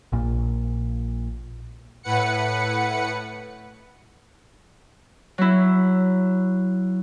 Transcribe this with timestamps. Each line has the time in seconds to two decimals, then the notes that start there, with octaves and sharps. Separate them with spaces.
0.12 A#1 A#2
2.03 A2 B4 F#5 C#7
5.38 F#3 E4